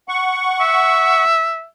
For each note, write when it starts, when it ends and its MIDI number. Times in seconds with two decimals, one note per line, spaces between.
0.08 1.25 78
0.08 1.25 85
0.61 1.65 76